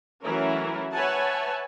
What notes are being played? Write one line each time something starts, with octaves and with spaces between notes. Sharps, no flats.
E3 F#3 A3 C#4 E4 A#4
B4 C#5 E5 F#5 G#5 A5